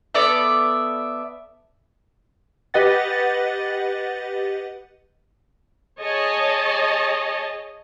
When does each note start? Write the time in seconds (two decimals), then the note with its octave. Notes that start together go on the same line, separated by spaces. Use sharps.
0.14 B3 A4 D5 E5
2.74 G4 B4 D#5 F#5 A6
5.99 G#4 C#5 D#5 A5